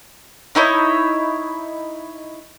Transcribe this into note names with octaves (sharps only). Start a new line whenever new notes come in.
D#4 E4 C#5 D#5